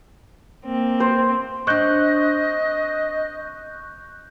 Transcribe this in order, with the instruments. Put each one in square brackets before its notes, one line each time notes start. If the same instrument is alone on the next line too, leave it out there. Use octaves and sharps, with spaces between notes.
[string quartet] A#3 C4
[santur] C5
[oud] C4 D4 [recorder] D#5 [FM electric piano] C#6 F#6 G6